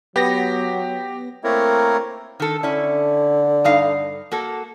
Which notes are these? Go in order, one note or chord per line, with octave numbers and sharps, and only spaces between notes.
F#3 B3 G4 A#6
A3 A#3 C4 E4 A#4 C#5
D#3 A4
D3 C#4 E4
G2 D#4 F5
A#3 F#4 A4